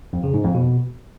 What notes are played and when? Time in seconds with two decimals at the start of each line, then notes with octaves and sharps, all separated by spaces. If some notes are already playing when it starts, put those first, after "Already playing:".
0.13 F2
0.23 C#3
0.34 G#2
0.44 F2
0.54 B2